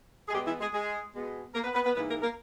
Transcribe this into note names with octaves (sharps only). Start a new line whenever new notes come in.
G#4
B2 G3 G#3 B3 G4
E3 E4
G#3 G#4
G#3 G#4
B2 G#3 B3
A#3 A#4
B3 B4
B3 B4
B3 B4
G#2 E3 G3 A#3 B3 B4
A#3 A#4
A#3 A#4